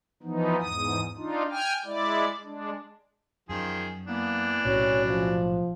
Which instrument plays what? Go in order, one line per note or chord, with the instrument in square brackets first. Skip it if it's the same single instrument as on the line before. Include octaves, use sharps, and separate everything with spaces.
[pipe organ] E3 F3 B3 D#4
E2 G#2 D#6
D4 D#4 F4
G5 G#5 F6
G#3 E4 D5
G#3 D4
[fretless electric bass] F#2 [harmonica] D#3 F3 G#4
[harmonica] E3 D4 [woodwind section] A#3 B3
[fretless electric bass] B1 A2 C3 [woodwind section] C#4 F#4 [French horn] C#5
[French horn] F3